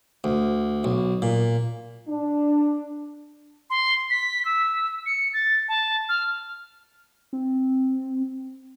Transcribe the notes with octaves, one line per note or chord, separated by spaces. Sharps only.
D2
B1
A#2
D4
C6
B6
E6
C#7
A6
A5
F6
C4